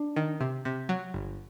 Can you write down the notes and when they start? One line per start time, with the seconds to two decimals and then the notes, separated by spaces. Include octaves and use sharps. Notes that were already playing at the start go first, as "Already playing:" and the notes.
Already playing: D4
0.16 D#3
0.41 C3
0.65 C3
0.89 F#3
1.14 G1